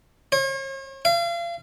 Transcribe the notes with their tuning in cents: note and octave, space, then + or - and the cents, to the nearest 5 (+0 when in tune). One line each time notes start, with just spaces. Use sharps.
C#5 -45
F5 -35